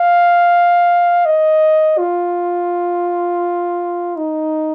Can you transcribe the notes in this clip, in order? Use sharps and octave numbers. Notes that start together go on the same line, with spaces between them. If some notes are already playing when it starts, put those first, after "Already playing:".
Already playing: F5
D#5
F4
D#4